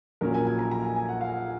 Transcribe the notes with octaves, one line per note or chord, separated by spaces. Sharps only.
A#1 A#2 F#3 C#4 A#4
G#5
G#5
A#5
A#5
G#5
G#5
F#5
F5